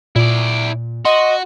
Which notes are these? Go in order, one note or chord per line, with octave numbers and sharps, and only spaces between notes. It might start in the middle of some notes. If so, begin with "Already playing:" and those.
A#2 E4 D5
F#4 D#5 C6